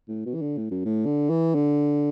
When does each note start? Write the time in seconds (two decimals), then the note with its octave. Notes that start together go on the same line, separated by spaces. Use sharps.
0.08 A2
0.25 B2
0.34 E3
0.41 D3
0.57 A2
0.71 F#2
0.85 A2
1.06 D3
1.30 E3
1.55 D3